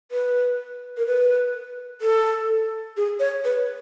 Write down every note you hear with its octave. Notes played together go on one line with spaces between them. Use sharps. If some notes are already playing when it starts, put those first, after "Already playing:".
B4
A#4
B4
A4
G#4
C#5
B4